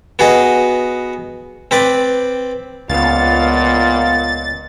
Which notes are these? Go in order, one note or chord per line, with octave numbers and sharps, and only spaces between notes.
B3 F#4 G#4 D#5
C4 B4 D5
C#2 A#2 B3 F5 A6